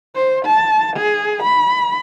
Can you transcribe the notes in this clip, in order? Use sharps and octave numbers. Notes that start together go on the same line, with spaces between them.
C5
A5
G#4
B5